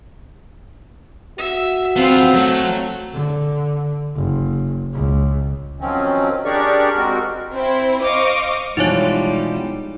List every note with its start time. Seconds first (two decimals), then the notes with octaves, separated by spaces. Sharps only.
1.38 F#4 E5
1.96 F2 B3 C4 F4 F5
2.34 F#3 A3
3.14 D3
4.16 F#1
4.94 C#2
5.80 D#3 F3 F#3 C4 C#4
6.45 D4 G4 G#4 A#4 D5 C#6
6.96 G#3 C4 F#4 A#4
7.53 C4 E4 C5
8.01 C5 D#5 F5 C#6 D6
8.77 B2 E3 F3 G3 G#3 D#4 E4 C#5